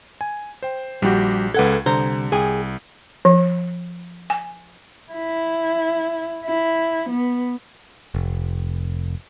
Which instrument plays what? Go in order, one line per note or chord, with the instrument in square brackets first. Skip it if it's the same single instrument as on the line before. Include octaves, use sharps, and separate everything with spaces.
[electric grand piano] G#5
C5 G5
[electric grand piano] A#1 G4 G6 [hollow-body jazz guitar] G3 F#4
[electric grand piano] C#2 F#5 G#6 [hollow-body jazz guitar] A4 B4
[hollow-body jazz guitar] C2 C5 A#5 [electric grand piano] D3
[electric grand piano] C2 [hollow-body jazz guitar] G#4 G5 G#5
[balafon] F3
G#5
[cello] E4
E4
B3
[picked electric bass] F1